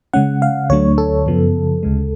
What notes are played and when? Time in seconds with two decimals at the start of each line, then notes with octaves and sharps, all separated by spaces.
0.13 C#3 G#3 C#4 F#5
0.42 F5
0.70 D2 D3 F#3 A3 D4 C#5
0.98 A4
1.26 F#2 C#3 F3 B3
1.83 D2 C#3 G#3